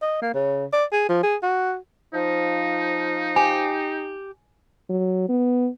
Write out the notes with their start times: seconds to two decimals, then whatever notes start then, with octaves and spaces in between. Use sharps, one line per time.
0.02 D#5
0.22 A#3
0.34 C#3
0.73 D5
0.92 G#4
1.09 F3
1.23 G#4
1.43 F#4
2.14 F3 D#4
3.36 G4 G#5
4.90 F#3
5.29 B3